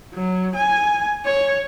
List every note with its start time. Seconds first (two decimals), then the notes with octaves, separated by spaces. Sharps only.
0.14 F#3
0.56 G#5
1.25 C#5